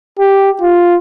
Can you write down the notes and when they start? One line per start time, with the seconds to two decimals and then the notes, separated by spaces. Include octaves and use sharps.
0.19 G4
0.62 F4